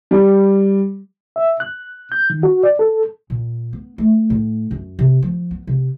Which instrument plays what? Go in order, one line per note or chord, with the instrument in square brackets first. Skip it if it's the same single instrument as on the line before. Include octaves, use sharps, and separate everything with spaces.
[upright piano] G3
[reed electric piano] E5
F#6
G6
D#3
F#4
D5
A4
[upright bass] A#2
B3
A3
A2
F#2
C3
F3
B3
C3